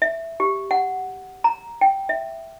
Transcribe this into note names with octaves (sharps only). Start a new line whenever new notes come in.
E5
G4
F#5
A#5
G5
E5